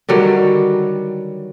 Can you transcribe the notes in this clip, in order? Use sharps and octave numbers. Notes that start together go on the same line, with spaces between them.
D3 D#3 F#3 G3